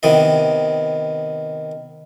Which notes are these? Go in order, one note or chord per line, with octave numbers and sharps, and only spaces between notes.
C3 D#3 B3 D#5